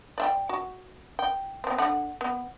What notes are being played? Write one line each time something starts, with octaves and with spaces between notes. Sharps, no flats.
D5 E5 G5
F#4
G5
B3 C4
D3 F#5
B3